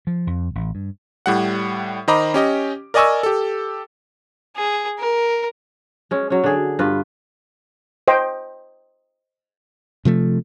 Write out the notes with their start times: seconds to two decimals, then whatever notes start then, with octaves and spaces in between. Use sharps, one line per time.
0.07 F3
0.27 F2
0.55 A1
0.75 G2
1.26 A2 G3 F#5
2.08 D#3 C5 D#5 A#5 B5 D6
2.34 C#4 G4 D#5
2.94 A#4 D5 D#5 G#5 C#6 E6
3.23 G4 A4
4.56 G#4
4.99 A#4
6.11 G#3 C#4
6.30 F#3 C#4
6.44 D3 G#4
6.79 G2 F4 B4
8.08 C5 D#5 G5
10.05 C3 F3 A3